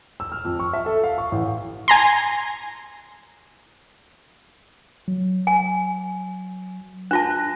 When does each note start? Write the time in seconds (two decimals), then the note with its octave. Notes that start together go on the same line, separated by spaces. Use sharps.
0.20 E6
0.32 F6
0.45 F2
0.59 C#6
0.73 E5
0.86 A4
1.04 F5
1.18 C#6
1.32 A1
1.88 G#5 A#5 C6
5.08 F#3
5.47 G#5
7.11 D4 F4 A5 F#6 A#6